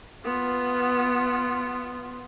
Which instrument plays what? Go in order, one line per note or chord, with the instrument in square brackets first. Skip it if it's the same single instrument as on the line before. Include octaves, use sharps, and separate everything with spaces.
[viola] B3 F4